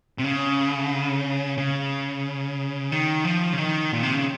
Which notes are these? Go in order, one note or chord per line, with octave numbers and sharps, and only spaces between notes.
C3
C#3
C#3
D#3
F3
C#3
D#3
A#2
C3
C#3